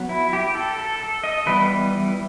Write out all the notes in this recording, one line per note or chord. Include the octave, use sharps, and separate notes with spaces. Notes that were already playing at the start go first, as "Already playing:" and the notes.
Already playing: F#3 B3
E4
G4
A4
A4
A4
D#5
E3 G3 B3 B4